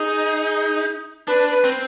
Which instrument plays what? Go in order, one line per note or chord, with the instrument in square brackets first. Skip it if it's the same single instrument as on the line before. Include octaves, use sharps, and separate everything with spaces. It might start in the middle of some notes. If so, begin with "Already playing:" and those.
Already playing: [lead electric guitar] D#4 [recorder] G#4
[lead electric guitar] D4 [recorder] B4
[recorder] B4
[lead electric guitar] C4